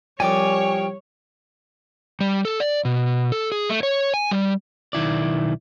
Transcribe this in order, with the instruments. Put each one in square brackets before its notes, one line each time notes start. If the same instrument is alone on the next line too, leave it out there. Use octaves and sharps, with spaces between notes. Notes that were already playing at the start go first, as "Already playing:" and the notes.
[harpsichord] C2 F3 D5 [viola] C#5 [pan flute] G5 [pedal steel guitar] G#5 D6
[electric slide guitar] G3
A4
D5
B2
A4
G#4
A3
C#5
G#5
G3
[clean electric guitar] B1 D#3 E4 D5